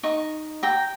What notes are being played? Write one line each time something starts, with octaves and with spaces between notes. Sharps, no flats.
D#4 C#6
G5 A#5